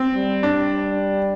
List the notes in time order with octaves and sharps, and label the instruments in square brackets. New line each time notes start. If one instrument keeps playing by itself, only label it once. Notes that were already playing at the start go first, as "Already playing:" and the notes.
Already playing: [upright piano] C4
[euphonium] G3
[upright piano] D4